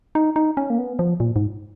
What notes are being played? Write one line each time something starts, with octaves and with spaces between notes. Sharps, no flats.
D#4
D#4
C#4
A#3
B3
F3
A#2
G#2